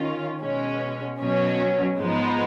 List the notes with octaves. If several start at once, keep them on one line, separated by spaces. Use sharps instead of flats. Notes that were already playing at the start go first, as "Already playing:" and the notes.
Already playing: D#3 C#4 F4
B2 G#3 C#4
B2 F#3 C#4
G#2 F3 G#3 B3 D#4